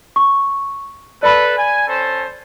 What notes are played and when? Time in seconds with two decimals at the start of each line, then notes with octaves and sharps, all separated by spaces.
0.16 C#6
1.23 A4 B4 D5 B5
1.57 G#5
1.88 C#4 A4 C5